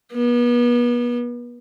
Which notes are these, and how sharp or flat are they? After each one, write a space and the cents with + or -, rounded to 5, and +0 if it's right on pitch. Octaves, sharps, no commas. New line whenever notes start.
B3 -35